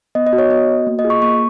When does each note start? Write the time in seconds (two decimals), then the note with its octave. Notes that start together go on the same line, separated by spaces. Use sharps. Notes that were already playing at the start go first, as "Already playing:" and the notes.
0.15 B3 D#5
0.27 D#5
0.33 F#4
0.38 C#5
0.50 B3 D#5
0.69 F#4
0.87 A#3
0.99 D#5
1.04 F4 G#4
1.10 C#6
1.22 A#3 C#6